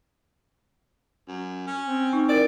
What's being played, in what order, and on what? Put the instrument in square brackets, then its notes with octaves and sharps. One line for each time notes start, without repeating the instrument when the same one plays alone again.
[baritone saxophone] F#2
C#4
[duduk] C4
[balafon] D#4
[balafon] E4 A#4 [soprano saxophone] D5